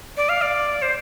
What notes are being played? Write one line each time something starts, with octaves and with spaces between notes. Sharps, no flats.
D5
F5
D5
C5